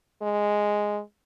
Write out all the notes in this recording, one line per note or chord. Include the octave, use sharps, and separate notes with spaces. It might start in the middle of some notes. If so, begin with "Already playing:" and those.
G#3